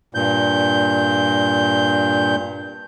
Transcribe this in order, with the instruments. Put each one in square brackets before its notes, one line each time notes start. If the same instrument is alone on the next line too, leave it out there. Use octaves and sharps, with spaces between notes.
[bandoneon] G2 A#2 G6